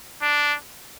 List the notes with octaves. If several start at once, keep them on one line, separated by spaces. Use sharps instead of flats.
D4